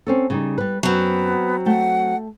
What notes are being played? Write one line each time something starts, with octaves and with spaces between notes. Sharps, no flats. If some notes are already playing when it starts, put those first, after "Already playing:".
C4 C#4 A4
C#3 G3 D#4
G3 B4
F#2 F#3 B3 C4
A3 F#5 G5 A5